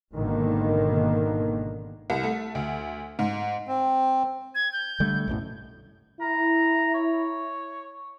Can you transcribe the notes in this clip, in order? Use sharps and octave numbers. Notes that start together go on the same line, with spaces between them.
G#1 B2 D3 D#3 A#3
C2
A3
D2
G#2
C4
G#6
G6
D3 G3 A3
B1 F#2 A2
E4 A#5
C#5